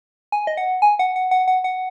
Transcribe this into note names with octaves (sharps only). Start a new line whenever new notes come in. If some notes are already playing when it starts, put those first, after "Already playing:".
G#5
D#5
F#5
G#5
F#5
F#5
F#5
F#5
F#5